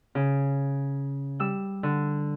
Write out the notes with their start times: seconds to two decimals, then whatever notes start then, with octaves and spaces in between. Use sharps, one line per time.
0.15 C#3
1.40 G3 E6
1.83 D3